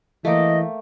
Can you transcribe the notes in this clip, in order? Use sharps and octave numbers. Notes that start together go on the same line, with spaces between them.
E3 A3 A#3 D#5 G5